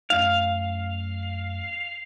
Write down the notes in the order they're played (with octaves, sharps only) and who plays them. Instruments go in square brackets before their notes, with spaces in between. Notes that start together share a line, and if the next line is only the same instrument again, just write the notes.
[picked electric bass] F#2 A3 C#4 [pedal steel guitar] F5